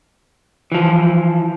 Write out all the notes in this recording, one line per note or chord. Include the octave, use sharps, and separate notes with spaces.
E3 F3